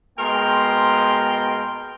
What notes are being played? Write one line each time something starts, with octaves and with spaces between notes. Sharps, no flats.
B2 G#3 A#3 A#4 G5 C6